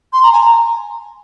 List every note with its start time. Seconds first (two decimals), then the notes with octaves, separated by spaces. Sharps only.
0.13 C6
0.23 A#5
0.33 G#5
0.43 A#5